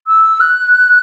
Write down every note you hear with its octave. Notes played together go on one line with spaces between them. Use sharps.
E6
F#6